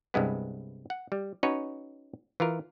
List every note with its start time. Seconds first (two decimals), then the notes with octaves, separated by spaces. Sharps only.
0.14 C2 G2 G#3 B3
0.90 F#5
1.12 G3
1.43 C#4 D#4 F#4 B4 C#5
2.40 E3 F4 A#4